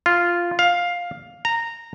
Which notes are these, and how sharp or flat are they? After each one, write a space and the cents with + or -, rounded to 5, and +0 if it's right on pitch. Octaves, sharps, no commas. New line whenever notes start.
F4 -5
F5 +10
A#5 -15